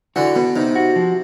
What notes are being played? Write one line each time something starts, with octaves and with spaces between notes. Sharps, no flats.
D3 E3 F#4
B2 B3
C3 D#4
F#4
F3